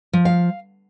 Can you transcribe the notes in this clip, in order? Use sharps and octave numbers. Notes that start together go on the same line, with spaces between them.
F3
F5